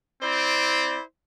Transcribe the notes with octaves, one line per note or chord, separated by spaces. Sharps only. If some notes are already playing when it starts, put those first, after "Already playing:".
C4 E4 C5 D5